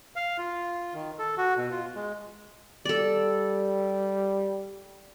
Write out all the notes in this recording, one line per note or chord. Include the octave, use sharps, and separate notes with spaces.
F5
F4
D#3
A4
F#4
B2
F4
G#3
G3 A4 D5